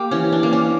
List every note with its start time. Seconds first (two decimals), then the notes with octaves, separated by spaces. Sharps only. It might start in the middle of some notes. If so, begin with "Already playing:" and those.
Already playing: A#3 G4
0.11 E3 C#4
0.32 D4
0.43 A#3
0.53 C#4